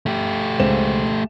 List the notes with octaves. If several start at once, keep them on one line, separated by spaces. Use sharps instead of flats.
A3 G4
C#2 C5 E7